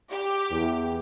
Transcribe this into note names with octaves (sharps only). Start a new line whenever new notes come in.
G4
E2